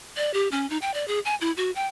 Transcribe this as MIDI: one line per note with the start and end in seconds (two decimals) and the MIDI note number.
0.17 0.33 74
0.34 0.48 67
0.52 0.68 61
0.70 0.78 63
0.82 0.93 79
0.94 1.07 74
1.08 1.20 68
1.25 1.35 80
1.41 1.52 64
1.57 1.71 66
1.76 1.87 79